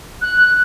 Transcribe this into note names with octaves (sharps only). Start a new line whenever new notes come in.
F#6